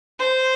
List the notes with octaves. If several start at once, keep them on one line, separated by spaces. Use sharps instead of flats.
C5